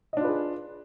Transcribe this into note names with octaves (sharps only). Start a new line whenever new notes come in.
D4 F4 G#4 B4 D#5